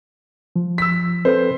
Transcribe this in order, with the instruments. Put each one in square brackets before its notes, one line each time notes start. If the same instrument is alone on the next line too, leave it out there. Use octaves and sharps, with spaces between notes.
[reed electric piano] F3
[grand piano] E6 B6
[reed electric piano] C4 A4 B4 [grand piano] C5